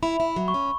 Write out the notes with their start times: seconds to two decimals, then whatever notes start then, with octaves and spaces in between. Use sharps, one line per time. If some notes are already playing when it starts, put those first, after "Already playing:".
0.03 E4 B5
0.20 E4
0.36 F#3
0.48 C#6
0.54 C#4